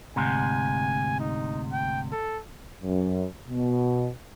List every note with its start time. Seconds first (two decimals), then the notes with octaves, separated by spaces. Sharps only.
0.16 D2 G#2 C3 G#5
1.20 D#4
1.72 G5
2.12 A4
2.83 F#2
3.49 B2